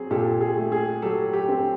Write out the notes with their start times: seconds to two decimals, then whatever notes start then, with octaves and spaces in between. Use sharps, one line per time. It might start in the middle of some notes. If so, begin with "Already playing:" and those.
Already playing: F#3 C4 G#4
0.11 A#2 G4 A4
0.41 G#4
0.57 A3
0.72 G#4
1.02 F#3 G4 A4
1.33 G4
1.49 C4